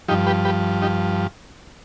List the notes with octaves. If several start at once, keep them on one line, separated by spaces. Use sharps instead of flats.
G2 F3 D#4 G4
G4 B4
G4 B4
D#4 G4